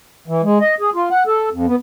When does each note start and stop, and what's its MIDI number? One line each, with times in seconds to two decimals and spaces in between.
0.28 0.42 52
0.43 0.58 56
0.60 0.75 75
0.80 0.90 68
0.95 1.09 65
1.10 1.24 78
1.27 1.49 69
1.52 1.66 41
1.67 1.76 59